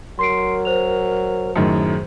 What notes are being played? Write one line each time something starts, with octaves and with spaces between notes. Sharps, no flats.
F#3 A#4 C6 C7 D7
C5 F7
F#2 A2 D#3 G#4